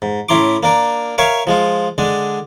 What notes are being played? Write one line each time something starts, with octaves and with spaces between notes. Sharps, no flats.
G#2
A2 C#4 E4 A#5 C6 D6
A#3 D4 A#4
A#4 C#5 E5 F5 G#5
F3 G#3 F4
D3 G#3 D4